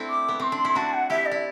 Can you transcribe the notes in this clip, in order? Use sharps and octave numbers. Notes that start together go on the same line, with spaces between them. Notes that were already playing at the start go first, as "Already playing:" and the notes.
Already playing: A3 C4 D4 E4
D6
B3
C4 C6
D4
E4
D4 F#4 A5
F#5
E4 G4 E5
D5
E4